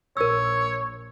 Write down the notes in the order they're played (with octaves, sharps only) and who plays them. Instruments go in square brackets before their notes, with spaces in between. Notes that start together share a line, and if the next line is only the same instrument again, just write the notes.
[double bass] A#1 [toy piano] A#4 E6 [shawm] C#5